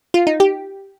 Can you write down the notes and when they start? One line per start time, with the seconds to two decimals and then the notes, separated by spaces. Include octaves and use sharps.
0.14 F4
0.27 D#4
0.40 G4